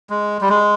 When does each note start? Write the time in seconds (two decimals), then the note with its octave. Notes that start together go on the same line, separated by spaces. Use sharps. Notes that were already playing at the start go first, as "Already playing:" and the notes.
0.10 G#3
0.41 G3
0.49 G#3